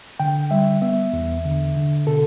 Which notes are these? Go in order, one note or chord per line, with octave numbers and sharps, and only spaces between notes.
D3 G5
G3 E5
B3 E5
E2
D3
D3
B2 A4